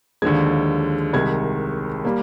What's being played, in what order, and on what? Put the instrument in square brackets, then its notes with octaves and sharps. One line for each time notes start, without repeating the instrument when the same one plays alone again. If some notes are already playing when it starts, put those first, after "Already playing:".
[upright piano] D#2 D3 F3 G#3 G#6
C2 C3 D#3 G#3 G#6
G3 A#3